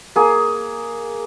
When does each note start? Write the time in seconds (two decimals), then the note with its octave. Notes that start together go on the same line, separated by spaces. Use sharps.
0.16 A#3 G#4